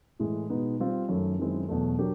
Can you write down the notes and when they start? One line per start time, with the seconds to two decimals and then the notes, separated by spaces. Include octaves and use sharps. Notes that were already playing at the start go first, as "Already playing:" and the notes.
0.20 A2 E3 G#3
0.50 B2 G#3 B3 D#4
0.80 G3 C4 F4
1.09 F#2 D#3 F#3 A3
1.38 F#2 D#3 G#3 C4 E4
1.68 E2 B2 F#3 A3
1.98 F#3 D4 G4 A#4